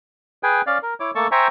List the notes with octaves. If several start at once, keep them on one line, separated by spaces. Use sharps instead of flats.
G#4 B4 G5 G#5
C#4 D5 F5
A#4
E4 C#5 D6
A3 A#3 A4 A5 C#6
C5 E5 G5 G#5 A#5 C#6